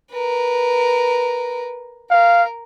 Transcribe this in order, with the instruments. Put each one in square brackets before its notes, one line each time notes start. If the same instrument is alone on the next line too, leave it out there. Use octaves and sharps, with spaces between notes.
[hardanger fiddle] A#4 B4
[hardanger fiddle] A#4 [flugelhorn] F5